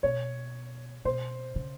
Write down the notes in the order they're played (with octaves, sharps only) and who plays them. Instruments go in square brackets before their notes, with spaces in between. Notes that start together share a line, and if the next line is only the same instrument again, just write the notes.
[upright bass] B2 [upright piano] C#5
[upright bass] B2 [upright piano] C5
[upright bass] C#3